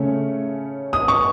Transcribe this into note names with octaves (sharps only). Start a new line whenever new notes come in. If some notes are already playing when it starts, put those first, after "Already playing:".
Already playing: C#3 A3 C#4
D#6
C#6